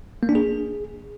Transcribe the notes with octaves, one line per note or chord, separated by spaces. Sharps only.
A#3
D4
G#4